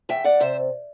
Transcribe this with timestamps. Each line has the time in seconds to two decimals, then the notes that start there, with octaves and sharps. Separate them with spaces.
0.09 E2 E5 G5
0.24 E2 D5 F#5
0.40 C3 C5 E5